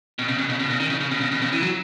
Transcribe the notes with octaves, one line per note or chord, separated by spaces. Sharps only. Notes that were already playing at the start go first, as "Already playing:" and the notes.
B2
C#3
B2
C#3
B2
C#3
D#3
C#3
C#3
B2
C#3
B2
C#3
E3
F#3